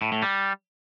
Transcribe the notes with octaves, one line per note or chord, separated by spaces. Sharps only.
A2
A2
G3